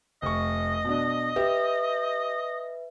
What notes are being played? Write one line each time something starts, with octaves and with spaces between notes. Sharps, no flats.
F1 D#5 C#6
B2 D4
G4 B4 E5